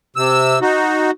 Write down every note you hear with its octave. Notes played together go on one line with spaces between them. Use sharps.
C3 E6
D#4 F#4